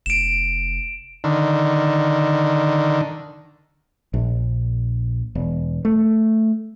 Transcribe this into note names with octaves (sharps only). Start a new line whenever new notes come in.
F1 D7 E7
D3 D#3
A#1
E1
A3